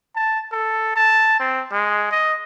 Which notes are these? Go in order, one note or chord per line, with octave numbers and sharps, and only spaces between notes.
A5
A4
A5
C4
G#3
D#5